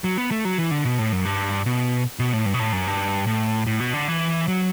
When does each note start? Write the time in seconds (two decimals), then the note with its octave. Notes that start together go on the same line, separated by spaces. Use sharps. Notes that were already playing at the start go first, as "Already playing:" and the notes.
0.04 F#3
0.18 B3
0.31 A3
0.45 F#3
0.59 E3
0.71 D3
0.85 B2
0.99 A2
1.12 F#2
1.25 G2
1.66 B2
2.19 B2
2.33 A2
2.46 G2
2.54 B2
2.59 A2
2.73 F#2
2.87 G2
3.27 A2
3.67 A2
3.80 B2
3.94 D3
4.08 E3
4.48 F#3